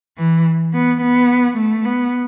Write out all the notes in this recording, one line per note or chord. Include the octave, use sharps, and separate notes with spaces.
E3
B3
B3
A3
B3